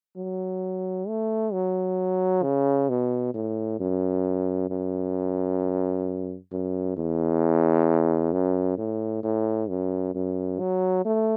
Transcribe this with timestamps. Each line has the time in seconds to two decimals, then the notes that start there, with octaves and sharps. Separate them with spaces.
0.17 F#3
1.08 A3
1.53 F#3
2.43 C#3
2.89 B2
3.34 A2
3.80 F#2
4.70 F#2
6.52 F#2
6.97 E2
8.33 F#2
8.78 A2
9.24 A2
9.69 F#2
10.15 F#2
10.60 F#3
11.05 A3